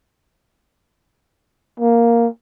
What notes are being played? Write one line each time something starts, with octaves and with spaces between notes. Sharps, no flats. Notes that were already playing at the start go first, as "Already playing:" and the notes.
A#3